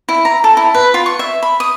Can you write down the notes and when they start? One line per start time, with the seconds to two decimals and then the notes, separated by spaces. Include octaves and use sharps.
0.09 E4
0.25 A#5
0.44 A4
0.57 E4
0.75 B4
0.94 F4
1.06 C#6
1.19 E5
1.43 B5
1.60 D#6